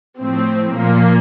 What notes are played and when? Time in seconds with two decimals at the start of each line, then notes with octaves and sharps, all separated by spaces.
0.20 A2 F3 C4
0.75 A#2 F3 A#3